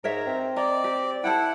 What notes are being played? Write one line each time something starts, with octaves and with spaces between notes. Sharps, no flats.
G#2 A#4 C#5 E5 A#5
C4
D5 D#5 A#5
G4
E4 A4 C5 F#5 G5